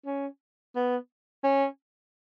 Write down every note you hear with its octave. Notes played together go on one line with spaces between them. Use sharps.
C#4
B3
C#4